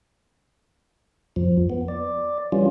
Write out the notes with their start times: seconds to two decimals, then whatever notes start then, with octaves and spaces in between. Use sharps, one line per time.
1.36 F2 F3
1.70 B3
1.88 D5
2.52 E3 G3 C#4 F4